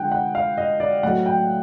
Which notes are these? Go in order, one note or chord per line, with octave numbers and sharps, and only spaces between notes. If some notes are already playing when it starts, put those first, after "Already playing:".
Already playing: D3 F3 G#3 F#5 G5
F#5
F5
D#5
D5
A2 F#3 A3 F#5
G5